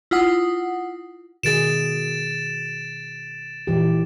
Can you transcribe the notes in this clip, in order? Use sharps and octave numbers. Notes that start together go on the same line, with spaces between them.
E4 F4 F#5 D#6
B2 D#3 G#4 A6 D7 E7
A#2 E3 G4